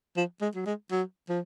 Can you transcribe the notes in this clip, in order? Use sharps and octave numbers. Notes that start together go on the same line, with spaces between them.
F3
G#3
F#3
G#3
F#3
F3